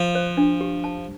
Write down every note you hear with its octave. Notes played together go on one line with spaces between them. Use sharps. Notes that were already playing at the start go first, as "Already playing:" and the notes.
Already playing: F3 F5
C5
D4
G4
A5